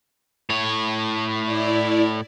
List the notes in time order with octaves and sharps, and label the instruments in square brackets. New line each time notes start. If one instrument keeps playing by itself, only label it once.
[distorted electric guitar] A2 C#5
[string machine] E4 D5